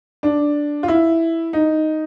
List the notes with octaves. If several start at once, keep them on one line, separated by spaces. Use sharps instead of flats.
D4
F4
E4
D#4